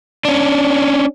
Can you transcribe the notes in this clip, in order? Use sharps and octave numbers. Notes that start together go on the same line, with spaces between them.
C#4 D4